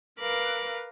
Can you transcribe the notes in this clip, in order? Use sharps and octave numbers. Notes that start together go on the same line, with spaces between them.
A#4 B4 F5 D6 F#6